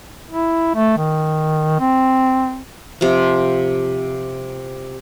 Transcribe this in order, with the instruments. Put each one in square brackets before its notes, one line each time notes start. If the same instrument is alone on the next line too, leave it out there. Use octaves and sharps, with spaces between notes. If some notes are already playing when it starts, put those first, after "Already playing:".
[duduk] E4
A3
D#3
C4
[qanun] C3 F3